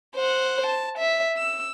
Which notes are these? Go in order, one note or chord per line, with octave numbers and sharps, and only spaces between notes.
C5 F#5
A5
E5
E6